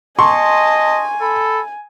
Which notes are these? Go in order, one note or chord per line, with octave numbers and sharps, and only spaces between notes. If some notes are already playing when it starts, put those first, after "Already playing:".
D#5 G#5 A5 C6 C#6
A4 B5